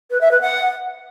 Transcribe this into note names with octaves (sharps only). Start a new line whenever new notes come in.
B4
E5
B4
F#5